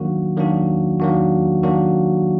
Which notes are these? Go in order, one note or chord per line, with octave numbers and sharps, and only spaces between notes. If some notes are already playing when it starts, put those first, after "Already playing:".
Already playing: D#3 F#3 A#3 D4 F#4
D#3 F#3 A#3 D4 F#4
D#3 F#3 A#3 D4 F#4
D#3 F#3 A#3 D4 F#4